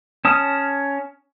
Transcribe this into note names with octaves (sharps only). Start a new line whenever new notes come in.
C#4 A5 D#6 F6